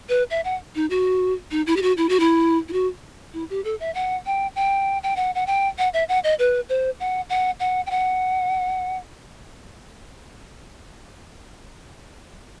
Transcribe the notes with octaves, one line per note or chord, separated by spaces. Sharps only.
B4
E5
F#5
D#4
F#4
D#4
E4
G4
F#4
E4
F#4
E4
E4
F#4
E4
G4
A4
E5
F#5
G5
G5
G5
F#5
F#5
G5
F#5
E5
F#5
D#5
B4
C5
F#5
F#5
F#5
G5
F#5